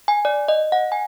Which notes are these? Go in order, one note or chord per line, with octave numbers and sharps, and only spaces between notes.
G#5
D5
D#5
F#5
G#5